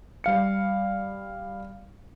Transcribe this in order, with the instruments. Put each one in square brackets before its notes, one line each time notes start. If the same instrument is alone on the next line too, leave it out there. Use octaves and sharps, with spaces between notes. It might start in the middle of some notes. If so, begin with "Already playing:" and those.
[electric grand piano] G3 F5 C#7